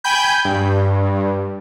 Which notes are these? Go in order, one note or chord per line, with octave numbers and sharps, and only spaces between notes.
G5 G#5 B5 G6
G2